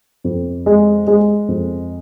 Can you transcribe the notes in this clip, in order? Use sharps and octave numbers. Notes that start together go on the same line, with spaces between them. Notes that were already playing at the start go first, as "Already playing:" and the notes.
F2
G#3
G#3
F2